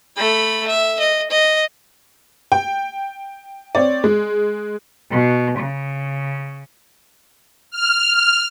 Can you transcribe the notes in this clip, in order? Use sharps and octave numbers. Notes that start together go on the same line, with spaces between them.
A3 B5
E5
D#5
D#5
G5
C4 C#5 D5
G#3
B2
C#3
F6